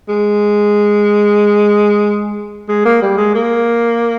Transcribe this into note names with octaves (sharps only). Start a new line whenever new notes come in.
G#3
G#3
A#3
G3
G#3
A#3